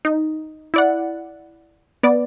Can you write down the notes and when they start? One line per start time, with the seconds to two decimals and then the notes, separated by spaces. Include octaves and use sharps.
0.05 D#4
0.74 E4 D5 F#5
2.03 B3 D5